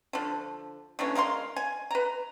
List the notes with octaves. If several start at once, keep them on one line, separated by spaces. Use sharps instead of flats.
D3 F3
D3 E3 A#3 C#4
G#3 A#4 F5 C6
G#5
B4 A#5